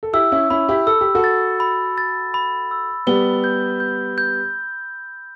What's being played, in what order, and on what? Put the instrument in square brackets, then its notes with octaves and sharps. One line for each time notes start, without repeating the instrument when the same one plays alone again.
[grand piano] A4
[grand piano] E4 G4 [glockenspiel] E6
[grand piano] C#4 E4
[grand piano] C#4 E4 [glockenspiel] B5
[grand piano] E4 G4
[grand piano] A4 [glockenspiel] E6
[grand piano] G4
F#4 A4
[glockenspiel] A6
B5
A6
B5
E6
[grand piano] G3 B3 [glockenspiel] G7
[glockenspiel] G6
G6
G6